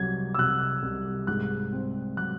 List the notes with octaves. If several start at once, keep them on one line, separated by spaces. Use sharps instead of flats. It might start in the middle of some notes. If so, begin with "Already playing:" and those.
Already playing: C2 F#3 G#6
E6
C3 F#6
C2
G#2 F#6
C4
F#3 F#6